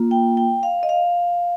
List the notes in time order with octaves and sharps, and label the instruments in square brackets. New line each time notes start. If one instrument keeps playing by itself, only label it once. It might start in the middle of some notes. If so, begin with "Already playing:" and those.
Already playing: [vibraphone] A#3 F4
G5
G5
F5
D#5
F5